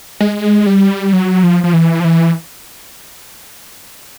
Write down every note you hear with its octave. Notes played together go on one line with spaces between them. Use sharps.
G#3
G3
F#3
F3
F3
E3
F3
E3